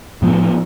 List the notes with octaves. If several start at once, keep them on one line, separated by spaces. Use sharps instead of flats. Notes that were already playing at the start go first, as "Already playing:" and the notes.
A2 F3 B3